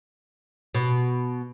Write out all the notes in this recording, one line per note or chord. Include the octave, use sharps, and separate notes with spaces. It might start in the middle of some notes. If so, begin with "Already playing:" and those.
B2